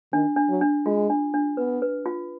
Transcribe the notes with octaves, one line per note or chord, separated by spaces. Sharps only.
D#3 D4
D4
F#3
D4
G#3 F4
D4
D4
B3 B4
B4
F4